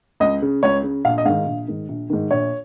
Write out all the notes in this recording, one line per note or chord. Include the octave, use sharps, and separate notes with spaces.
C#2 D#5
C#3
C#2 C#5
C#3
A#1 F5
D#5
G#2 D#3 F5
A#1
G#2 D#3
A#1
G#2 D#3
A#1 C#5